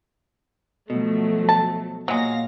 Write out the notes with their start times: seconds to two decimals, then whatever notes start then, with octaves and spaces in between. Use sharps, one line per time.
0.90 B2 F3 F#3 A3
1.49 A5
2.08 A#2 F#3 G#3 F5 A#6